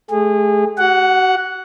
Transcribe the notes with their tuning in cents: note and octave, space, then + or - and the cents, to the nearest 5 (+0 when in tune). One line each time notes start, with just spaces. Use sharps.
A3 -40 G#4 -30
F#4 +35 F#5 +0